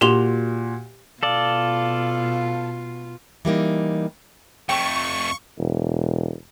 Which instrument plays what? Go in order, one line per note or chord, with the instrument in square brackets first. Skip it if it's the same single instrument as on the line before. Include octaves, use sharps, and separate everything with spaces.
[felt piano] A#2 F#4 [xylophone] G4 C6 F7
[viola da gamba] B2 F4 [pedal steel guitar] A4 D5 [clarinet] F5
[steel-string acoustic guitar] E3 G3 A#3 D#4
[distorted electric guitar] F2 A3 [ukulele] G5 [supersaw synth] C#6
[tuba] E1